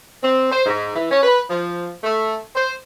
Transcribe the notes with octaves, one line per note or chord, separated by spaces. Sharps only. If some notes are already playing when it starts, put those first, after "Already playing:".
C4
C5
G#2
E3
C#4
B4
F3
A3
C5